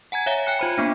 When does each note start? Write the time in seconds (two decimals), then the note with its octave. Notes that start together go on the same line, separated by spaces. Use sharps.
0.12 F#5 G#5 A#5 G#6
0.26 C#5 E5 F5 G#5 A#5
0.46 G5 G#5 F#6 C#7
0.59 F4 C5 B5
0.78 A#3 B3 D4